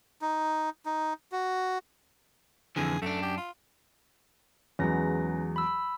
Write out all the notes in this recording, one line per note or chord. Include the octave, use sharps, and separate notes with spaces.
D#4
D#4
F#4
F2 D3 E3 G#4
F#2 A3 D4
G4
F4
E2 F#3 G#3 C#4 B4 A#6
B5 E6